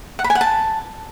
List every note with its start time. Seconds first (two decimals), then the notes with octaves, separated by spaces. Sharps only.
0.19 F#5
0.24 B5
0.30 G#5
0.35 F#5
0.41 A5